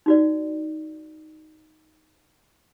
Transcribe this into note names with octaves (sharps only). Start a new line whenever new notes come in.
D#4 F#4 D5